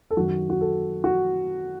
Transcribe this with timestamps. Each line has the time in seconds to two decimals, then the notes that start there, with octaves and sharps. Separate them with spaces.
0.11 A4
0.17 F#2 D#3 F#4
0.50 F#4
0.61 A4
1.04 F#4